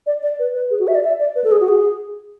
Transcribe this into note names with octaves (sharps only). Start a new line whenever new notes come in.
D5
D5
B4
B4
G#4
F#4
E5
D5
E5
D5
B4
A4
G#4
F#4
G#4